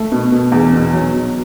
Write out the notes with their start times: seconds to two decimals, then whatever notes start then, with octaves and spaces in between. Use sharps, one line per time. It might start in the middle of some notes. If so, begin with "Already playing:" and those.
Already playing: A3
0.12 B2
0.32 B2
0.52 E2
0.73 B2
0.93 F#3
1.13 B2